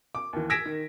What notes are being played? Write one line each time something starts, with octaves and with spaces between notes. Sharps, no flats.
D6
D#2 E3
E6 G#6 A#6 B6 D7 E7
D#3